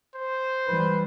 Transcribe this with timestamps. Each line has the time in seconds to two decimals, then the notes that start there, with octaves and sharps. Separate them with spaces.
0.14 C5
0.67 E3 G3 B4